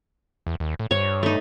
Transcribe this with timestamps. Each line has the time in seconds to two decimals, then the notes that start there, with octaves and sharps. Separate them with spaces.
0.47 E2
0.60 D#2
0.79 A2
0.91 G2 C#5
1.23 A3 D#4